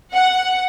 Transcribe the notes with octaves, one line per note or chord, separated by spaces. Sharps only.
F#5